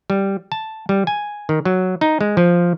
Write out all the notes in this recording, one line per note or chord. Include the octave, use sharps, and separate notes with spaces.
G3
A5
G3
G#5
D#3
F#3
D#4
G#3
F3